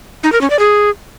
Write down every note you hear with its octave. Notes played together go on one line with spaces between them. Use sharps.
D#4
A#4
C#4
D5
G#4